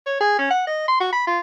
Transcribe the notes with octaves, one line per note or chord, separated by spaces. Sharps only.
C#5
G#4
C#4
F#5
D#5
C6
F#4
B5
F4